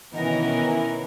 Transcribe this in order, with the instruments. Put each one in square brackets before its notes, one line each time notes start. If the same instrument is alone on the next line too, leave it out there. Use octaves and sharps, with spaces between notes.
[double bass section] B2 D#3 B3 [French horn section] E3 [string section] C#4 A#4 [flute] D#5